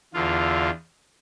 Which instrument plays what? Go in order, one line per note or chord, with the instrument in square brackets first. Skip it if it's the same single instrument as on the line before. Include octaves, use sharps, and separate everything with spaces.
[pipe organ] E2 D3 F4